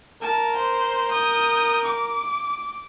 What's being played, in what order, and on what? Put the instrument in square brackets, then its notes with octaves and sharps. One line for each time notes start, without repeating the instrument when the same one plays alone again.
[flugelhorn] A#4 [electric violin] A5
[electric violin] C5
D#6 G6
D6